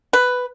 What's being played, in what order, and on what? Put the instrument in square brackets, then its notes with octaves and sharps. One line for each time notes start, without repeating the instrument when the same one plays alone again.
[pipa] B4